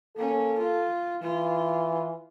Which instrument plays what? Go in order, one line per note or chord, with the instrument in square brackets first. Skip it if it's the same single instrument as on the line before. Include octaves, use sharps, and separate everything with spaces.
[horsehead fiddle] A#3 C#4 [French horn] A4
[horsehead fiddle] F4
[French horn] E3 [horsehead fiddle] F4